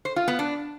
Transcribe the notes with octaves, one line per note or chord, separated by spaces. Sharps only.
C5
F4
B3
D4